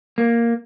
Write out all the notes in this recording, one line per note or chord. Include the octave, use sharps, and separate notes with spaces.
A#3